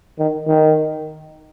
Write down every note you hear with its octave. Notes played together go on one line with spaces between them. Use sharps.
D#3
D#3